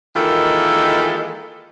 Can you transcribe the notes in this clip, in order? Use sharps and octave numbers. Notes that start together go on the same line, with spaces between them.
D#3 E3 G#3 A#3 F4 A4